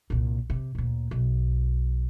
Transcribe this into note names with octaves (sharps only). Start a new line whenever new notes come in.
C2 A#2
C3
D2 A#2
B1